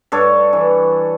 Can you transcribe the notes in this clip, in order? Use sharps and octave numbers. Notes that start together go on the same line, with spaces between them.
G2 A4 C#5
E3